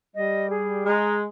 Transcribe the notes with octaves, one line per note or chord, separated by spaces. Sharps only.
G3 D#5
G#4
G#3 A#5